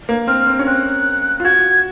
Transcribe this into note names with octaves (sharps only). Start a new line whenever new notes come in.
A#3
C4 F6
C4
C#4
C4 F#6
F4
F#4 G#6